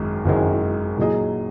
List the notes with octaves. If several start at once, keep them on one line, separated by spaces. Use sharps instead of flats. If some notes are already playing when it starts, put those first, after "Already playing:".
Already playing: G#1 F#2 D#3 G#3
G#1 F#2 D#3 G#3
A#2 F#3 D#4 G#4 D#5